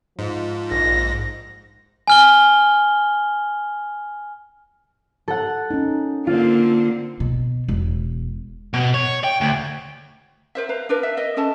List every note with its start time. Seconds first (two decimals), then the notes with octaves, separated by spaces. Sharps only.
0.19 G#2 F3
0.71 A#1 A#6
2.07 G#5 F6 G7
5.28 A4 F#5
5.71 C#4 D#4
6.27 D3 A#3 C4 F4
7.20 B2
7.68 E1
8.74 B2
8.94 C#5
9.24 G5
9.41 D2
10.55 A#4 C5 E5
10.69 B4 F5 A#5
10.89 D4 A#4 B4
11.03 E5
11.17 A#4 D#5 E5
11.37 C#4 A4 D#5 A5